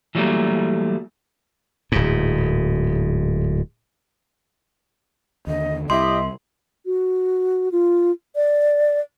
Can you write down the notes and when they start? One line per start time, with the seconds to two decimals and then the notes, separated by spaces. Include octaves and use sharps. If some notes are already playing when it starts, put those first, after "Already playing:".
0.15 E3 F#3 G3 A3 A#3
1.92 D1 G#2
5.47 D#2 D3 D#5
5.90 C2 E4 G4 D#5 E5 C6
6.86 F#4
7.72 F4
8.36 D5